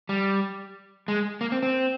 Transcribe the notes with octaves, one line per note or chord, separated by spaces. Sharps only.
G3
G#3
A#3
C4
C4